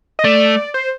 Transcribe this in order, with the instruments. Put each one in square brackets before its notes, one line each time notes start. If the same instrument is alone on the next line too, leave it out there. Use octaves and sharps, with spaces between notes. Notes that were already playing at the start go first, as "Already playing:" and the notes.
[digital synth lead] D#5
[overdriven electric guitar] A3 [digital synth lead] D5
[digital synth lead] C5